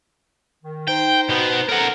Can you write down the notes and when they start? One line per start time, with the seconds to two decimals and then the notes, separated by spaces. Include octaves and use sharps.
0.63 D#3
0.88 D#4 C5 G5
1.29 B2 B3
1.69 A4 A#4 C5 F#5 A#5